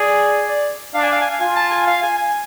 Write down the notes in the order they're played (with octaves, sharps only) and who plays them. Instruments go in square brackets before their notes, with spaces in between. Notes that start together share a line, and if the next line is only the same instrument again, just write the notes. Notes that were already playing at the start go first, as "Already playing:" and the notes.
Already playing: [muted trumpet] G#4 [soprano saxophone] D5
[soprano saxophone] D5
[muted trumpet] D4 [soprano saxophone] F5
[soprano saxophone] G#5
F5
G#5
F5
[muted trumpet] F4 [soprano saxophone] G#5
[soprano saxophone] A5
G#5
F5
G#5
G#5